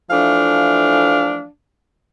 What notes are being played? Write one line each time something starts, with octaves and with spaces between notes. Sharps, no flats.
E3 F3 A3 D4 F5